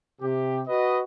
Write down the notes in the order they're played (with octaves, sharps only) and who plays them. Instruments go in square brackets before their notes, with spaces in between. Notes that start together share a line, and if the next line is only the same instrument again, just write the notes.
[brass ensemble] C3 G4
F#4 B4 D#5